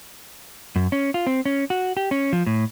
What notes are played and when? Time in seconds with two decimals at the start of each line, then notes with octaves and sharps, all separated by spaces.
0.76 F#2
0.92 C#4
1.14 F4
1.27 C4
1.45 C#4
1.70 F#4
1.97 G4
2.11 C#4
2.33 F3
2.46 A2